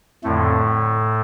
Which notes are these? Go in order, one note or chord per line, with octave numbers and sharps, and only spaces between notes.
F2 A2 D3 A3